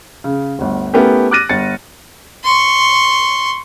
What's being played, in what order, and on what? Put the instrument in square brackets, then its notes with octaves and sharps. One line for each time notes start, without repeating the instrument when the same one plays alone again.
[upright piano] C#3
G1 D2
A3 B3 C#4 E4 G4 A#4
D6 F6 F#6 A6 A#6 D#7
G1 A6 C#7
[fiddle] C6 C#6